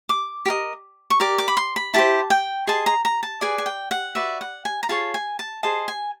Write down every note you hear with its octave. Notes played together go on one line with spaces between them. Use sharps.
D6
G4
A#4 D#5
C#6
G4 A#4 D5 D6
D6
B5
C6
B5
E4 G4 C5 A5
G5
G#4 C5 D#5 A5
A#5
A#5
A5
G#4 B4 D5 G#5
G#5
G5
F#5
F#4 B4 D5 E5
F#5
G#5
A#5
F4 G#4 C#5 A5
G#5
A5
G#4 C5 D#5 A5
G#5